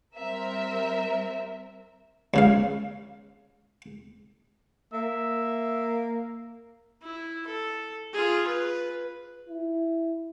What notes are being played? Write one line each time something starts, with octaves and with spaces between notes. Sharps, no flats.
G3 C4 A#4 E5
C#2 C#3 F5
A#3 E5
E4
A4
F4 G#4
B4
E4